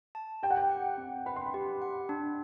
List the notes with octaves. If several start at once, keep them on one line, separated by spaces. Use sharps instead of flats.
A5
G4 G5
F#5
G5
F#5
C4
B4 B5
C6
B5
G4
F#5
D4